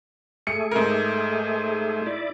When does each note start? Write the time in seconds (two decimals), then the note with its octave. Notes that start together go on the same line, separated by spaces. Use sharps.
0.47 A3 G#4 C#7
0.71 G#2 A#4
2.06 E4 D5